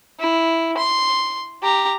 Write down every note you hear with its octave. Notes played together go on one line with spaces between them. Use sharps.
E4
C6
G4 A#5